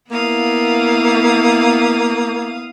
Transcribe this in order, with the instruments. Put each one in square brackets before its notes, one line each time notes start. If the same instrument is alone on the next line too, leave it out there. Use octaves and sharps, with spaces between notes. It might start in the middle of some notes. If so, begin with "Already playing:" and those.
[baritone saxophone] A#3 [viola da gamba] B3 E4 [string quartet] F5 D#6